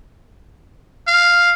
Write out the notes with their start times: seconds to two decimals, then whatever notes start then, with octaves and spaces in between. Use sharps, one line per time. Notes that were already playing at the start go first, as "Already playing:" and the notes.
1.08 F5